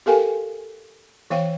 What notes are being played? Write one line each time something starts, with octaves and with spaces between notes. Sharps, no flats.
G4 A4 A#4 F5 G5 G#5
E3 C#5 F5 G5